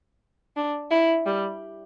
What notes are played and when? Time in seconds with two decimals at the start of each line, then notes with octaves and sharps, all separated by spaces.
0.56 D4
0.91 E4
1.26 G3